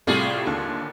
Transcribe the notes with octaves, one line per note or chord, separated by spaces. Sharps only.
A2 C3 G3 A3 F4 G#4
D#2 D3